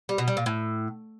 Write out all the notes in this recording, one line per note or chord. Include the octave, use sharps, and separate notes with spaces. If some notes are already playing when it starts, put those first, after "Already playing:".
G3
B2
G3
A#2
A2